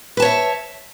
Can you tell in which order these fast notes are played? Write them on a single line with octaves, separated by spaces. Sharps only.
B4 A5 C#5 E5